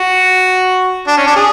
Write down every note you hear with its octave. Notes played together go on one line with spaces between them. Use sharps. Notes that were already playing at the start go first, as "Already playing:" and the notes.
Already playing: F#4
D4
C#4
D4
G#4